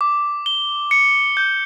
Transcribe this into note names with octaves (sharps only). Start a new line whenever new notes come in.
D6
G7
C#7
G6